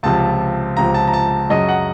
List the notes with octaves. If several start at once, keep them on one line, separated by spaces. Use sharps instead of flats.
C#2 C3 F3 A5
C#2 C3 F3 A#5
A5
A#5
A5
F#2 C#3 F#3 D#5
F#5